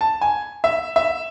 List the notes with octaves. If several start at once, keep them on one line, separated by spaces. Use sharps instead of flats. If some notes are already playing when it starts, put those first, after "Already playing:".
A5
G#5
E5
E5